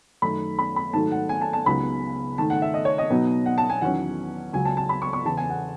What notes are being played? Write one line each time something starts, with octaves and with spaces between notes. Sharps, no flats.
F#2 D#3 A3 D#4 B5
B5
B5
G#2 D#3 F#3 A3 A5
F#5
G#5
A5
A5
C#2 C#3 F#3 B3 D#4 B5
G#2 D#3 A3 A5
F#5
E5
D#5
C#5
D#5
B2 F#3 B3 D#4
F#5
A5
G#5
E2 D#3 F#3 C#4 F#5
C#2 C#3 F#3 G#5
A5
A5
B5
C#6
C#6
E2 C#3 E3 A5
G#5
F#5